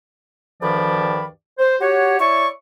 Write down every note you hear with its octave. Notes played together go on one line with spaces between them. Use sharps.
D2 G2 D#3 F3 D5 B5
C5
F#4 G4 C#5
E4 C#5 D5 C#6